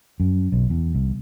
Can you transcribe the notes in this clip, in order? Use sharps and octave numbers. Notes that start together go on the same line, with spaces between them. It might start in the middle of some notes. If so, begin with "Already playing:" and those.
F#2
B1
E2
C2